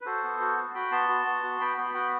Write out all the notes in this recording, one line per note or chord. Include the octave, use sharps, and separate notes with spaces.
B4
F#4 A4 C5
B3
F#4
F#4
F#4 G5 B5
B3 A5 C6
F#4
B3
F#4
B3 G5 B5
B3 G5 B5
F#4 G5 B5